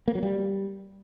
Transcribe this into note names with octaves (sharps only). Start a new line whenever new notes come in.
A#3
F#3
G3